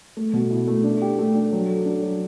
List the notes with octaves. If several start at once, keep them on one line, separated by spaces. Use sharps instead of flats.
A3
B2
E4
A3
D4
G4
A3
D4
F#3
A4
D4
F#3